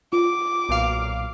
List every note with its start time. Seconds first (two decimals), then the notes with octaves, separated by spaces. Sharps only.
0.13 F4 D6
0.69 B1 A#2 F5